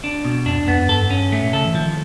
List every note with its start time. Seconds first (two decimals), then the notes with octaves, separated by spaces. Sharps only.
0.04 D4
0.25 B2
0.46 F2 D4
0.57 E2
0.68 F2 B3
0.78 F#2
0.89 G2 A4
1.10 C#4
1.32 G#2 A3
1.42 A#2
1.53 C#3 A4
1.64 E3
1.75 D#3 F3